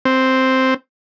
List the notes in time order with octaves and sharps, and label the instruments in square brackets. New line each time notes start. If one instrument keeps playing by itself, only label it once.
[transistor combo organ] C4